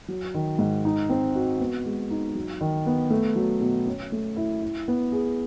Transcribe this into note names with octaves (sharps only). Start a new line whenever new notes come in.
F#3
D#3
G#2
D#4
C4
F#4
B3
G#3
D#4
F#3
D#3
B3
A3
F#3
B2
C#4
A3
E4
E4
B3
G#4